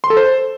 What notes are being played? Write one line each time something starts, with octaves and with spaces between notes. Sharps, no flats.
C6
A4
C5